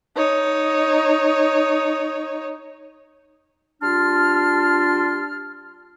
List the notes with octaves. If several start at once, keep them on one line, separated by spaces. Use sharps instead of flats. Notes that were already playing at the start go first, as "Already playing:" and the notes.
D#4 C#5
G3 D4 F4 A5 C6 F6